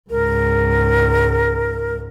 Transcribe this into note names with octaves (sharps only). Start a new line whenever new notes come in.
C#2 G#2 A#4